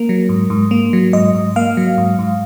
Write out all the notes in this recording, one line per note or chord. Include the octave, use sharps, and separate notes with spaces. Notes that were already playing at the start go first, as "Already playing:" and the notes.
Already playing: A#3 A#4
F#3
G#2
G#2
A#3
F#3
G#2 D#5
G#2
A#3 F5
F#3
G#2
G#2